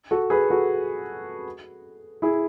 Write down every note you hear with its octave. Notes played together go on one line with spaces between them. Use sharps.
F#4 A4
G#4 B4
F#4 A4
E4 G#4